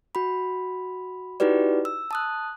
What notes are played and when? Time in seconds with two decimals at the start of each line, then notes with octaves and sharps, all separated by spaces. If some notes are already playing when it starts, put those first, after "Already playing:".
0.15 F#4 B5
1.40 D#4 E4 F#4 G4 B4 D5
1.85 E6
2.11 A5 D#6 F#6